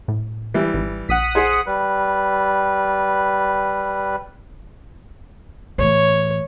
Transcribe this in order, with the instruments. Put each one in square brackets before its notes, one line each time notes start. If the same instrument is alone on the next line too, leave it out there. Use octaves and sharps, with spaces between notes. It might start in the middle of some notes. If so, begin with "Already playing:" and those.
[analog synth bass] A2
[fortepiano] E3 G3
[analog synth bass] G#1
[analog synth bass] A#1 [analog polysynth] F#5 D#6 B6
[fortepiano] G#4 C5
[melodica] G3 B4
[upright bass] A2 E3 [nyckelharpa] C#5